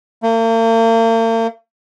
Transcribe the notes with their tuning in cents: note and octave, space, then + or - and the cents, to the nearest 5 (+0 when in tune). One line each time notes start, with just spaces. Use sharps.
A#3 -45